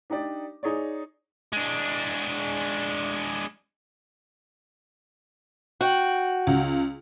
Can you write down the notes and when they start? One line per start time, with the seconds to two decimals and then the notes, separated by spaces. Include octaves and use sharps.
0.10 D4 D#4 G4 D5
0.63 D#4 G#4 C#5 D5
1.53 G#3 D4
5.81 F#4 G5
6.47 C#2